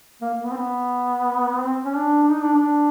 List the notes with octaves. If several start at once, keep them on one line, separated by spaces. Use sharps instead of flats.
A#3
A#3
B3
C4
B3
C4
C#4
D4
D4
D#4
D4
D4